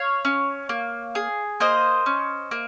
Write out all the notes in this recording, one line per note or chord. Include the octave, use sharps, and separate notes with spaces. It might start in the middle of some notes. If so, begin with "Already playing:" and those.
Already playing: C#5 F5
C#4
A#3
G#4
A#3 C5 D#5
C#4
A#3